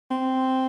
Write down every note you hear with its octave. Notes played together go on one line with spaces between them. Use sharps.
C4